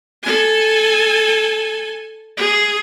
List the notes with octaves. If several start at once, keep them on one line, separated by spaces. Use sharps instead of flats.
A4 G#5
G#4